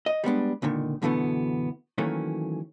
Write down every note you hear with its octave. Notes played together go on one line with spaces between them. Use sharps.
D#5
G3 G#3 B3 D4
C#2 A#2 D3 D#3
F#2 B2 D3 E3 A3 B3
D#3 E3 F#3 A3 A#3 C#4